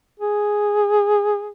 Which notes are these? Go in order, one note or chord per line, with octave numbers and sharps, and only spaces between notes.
G#4